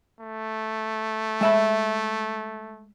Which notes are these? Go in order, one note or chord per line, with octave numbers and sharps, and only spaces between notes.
A3
G#3 E5 B5